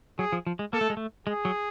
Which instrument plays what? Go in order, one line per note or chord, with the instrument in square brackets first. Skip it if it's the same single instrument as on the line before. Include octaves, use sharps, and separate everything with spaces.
[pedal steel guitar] F#3 [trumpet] G#4
[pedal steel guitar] F3
F3
G#3
[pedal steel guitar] A#3 [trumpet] A4
[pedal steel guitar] A3
G#3
A3
[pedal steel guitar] G#3 [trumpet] G#4
[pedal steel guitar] F#3